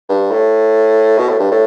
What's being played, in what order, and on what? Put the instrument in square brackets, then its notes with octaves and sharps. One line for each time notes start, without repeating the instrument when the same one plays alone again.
[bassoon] G2
A2
B2
A2
G2
A2